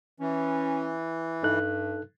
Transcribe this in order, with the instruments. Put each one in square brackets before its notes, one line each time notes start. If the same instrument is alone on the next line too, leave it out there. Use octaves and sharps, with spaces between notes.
[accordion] E3 [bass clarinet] C#4
[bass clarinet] G2 [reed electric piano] D#4 A4 F#6